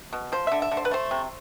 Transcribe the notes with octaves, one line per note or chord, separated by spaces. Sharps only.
B2
F3 C5
D3 E5
E5
D3
C5
B4
A3 C5
C3